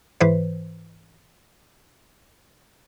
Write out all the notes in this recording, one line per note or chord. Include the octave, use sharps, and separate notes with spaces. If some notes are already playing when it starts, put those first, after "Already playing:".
G#2 E3 B4 C5